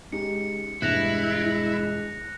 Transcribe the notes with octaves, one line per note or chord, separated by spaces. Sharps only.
G#3 C#4 D#4 G4 C#7
E1 G2 G#3 E4 F#6 A#6 F7